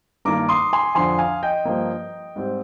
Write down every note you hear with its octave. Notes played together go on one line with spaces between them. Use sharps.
G2 D#3 A#3 A#5 D6
C6 D#6
G#5 C6
F2 D3 F3 G#5 C6
F5 G#5
D#5 G5
G2 F3 A#3
G#2 G3 C4